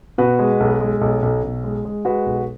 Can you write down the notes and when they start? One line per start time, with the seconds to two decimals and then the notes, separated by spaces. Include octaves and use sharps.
0.18 B2 F#4 B4
0.39 G#3
0.60 B1
0.81 G#3
1.01 B1
1.22 B1
1.43 B1
1.64 G#3
1.85 G#3
2.05 G#3 F#4 B4
2.26 B1